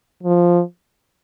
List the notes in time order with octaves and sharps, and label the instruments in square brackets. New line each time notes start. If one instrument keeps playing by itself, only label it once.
[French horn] F3